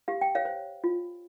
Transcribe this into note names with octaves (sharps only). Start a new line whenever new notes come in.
G4 F5
G5
C#5 F5
C5
F4